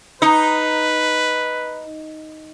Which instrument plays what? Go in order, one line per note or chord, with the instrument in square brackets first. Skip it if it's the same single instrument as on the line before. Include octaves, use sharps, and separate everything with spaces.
[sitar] D#4 [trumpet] B4 [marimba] A#5 D#6